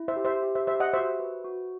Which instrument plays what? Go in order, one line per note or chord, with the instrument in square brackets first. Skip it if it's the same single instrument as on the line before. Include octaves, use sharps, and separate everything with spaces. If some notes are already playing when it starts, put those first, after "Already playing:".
Already playing: [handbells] E4
[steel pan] C5 E5
[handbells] G4
[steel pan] C5 E5
[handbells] G4
[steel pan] C5 E5
[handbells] G4 [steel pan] C5 E5
[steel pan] D#5 F#5
[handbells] F#4 [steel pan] C5 E5
[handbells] B4
F#4